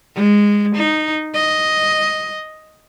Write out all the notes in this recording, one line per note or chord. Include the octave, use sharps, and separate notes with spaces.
G#3
D#4
D#5